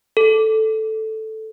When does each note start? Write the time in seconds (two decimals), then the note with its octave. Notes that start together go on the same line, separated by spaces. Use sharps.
0.17 A4